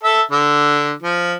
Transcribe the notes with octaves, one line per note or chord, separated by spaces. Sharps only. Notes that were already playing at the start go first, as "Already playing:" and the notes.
A4 E5
D3
F3